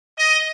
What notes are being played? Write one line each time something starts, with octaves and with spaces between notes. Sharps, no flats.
D#5